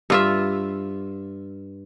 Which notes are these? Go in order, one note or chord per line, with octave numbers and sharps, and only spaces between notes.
G2 F4 E5